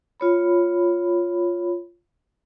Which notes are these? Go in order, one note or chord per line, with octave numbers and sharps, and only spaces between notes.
F4 C#5 B5